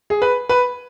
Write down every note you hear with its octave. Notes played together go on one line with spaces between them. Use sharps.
G#4
B4
B4